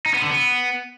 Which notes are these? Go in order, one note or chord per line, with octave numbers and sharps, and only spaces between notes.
D#4
B3
D3
B3